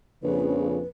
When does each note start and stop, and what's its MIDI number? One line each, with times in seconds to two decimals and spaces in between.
0.23 0.83 34
0.23 0.80 41
0.23 0.80 49
0.23 0.88 71